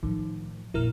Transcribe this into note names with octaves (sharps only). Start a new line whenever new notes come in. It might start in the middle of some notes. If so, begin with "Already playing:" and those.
A2 D#3 F3
A#1 F2 E4 A#4 F6